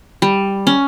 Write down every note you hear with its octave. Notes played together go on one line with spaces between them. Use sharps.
G3
C#4